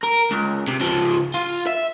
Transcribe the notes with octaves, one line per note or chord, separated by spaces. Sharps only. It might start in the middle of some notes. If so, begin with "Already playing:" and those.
A#4
C#2
C3
C#2 F3
F4
E5